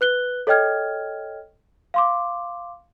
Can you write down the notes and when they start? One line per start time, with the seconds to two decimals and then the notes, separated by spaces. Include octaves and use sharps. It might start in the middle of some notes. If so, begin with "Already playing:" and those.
0.01 B4 F#6 G7
0.47 A4 C#5 D#5 G5 F6 G#6
1.94 F5 C6 D6